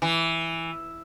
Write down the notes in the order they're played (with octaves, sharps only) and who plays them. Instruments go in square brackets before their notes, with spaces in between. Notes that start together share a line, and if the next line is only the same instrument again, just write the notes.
[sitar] E3